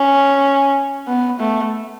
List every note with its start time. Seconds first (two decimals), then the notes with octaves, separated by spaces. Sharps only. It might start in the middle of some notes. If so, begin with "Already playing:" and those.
Already playing: C#4
1.08 B3
1.40 A3